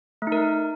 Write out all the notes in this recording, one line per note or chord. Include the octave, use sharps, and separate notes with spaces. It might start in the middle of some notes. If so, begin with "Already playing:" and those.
A3
D#4
A#4